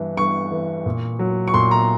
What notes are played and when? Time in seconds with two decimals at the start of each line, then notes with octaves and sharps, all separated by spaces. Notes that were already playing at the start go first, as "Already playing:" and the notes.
Already playing: G2 E3
0.17 G2 C#6
0.52 E3
0.86 A#2
1.19 F#3
1.48 C#6
1.54 A#2 C6
1.71 A#5